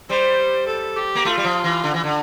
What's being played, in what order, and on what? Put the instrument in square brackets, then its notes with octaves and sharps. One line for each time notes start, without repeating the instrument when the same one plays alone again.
[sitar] G3 [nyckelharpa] C5
[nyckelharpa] A4
G4
[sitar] A#3
[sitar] A3 [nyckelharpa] F4
[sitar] G3
F3
E3
D3
E3
D3